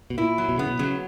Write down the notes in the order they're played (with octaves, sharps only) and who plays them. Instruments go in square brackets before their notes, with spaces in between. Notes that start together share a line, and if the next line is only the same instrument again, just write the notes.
[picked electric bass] B2
[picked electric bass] A#2 [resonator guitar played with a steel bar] E4
[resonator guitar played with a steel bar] F#3
[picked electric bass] B2
[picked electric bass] C#3 [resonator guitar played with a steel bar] B3
[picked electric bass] B2
[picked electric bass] C#3 [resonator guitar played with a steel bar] F#3